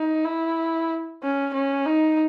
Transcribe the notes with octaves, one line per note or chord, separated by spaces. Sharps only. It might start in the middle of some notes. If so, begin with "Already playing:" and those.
Already playing: D#4
E4
C#4
C#4
D#4